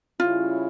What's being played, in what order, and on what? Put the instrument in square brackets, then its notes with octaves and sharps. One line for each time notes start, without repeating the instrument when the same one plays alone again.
[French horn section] C#3 G3 C#4 E4 [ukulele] F4